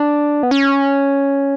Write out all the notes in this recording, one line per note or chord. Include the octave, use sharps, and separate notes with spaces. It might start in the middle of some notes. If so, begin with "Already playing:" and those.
Already playing: D4
B3
C#4